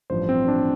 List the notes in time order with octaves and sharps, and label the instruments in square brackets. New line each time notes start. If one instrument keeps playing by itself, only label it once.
[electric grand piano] A1 G2 F3 C5
C4
D4